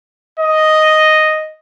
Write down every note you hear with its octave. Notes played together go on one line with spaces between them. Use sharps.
D#5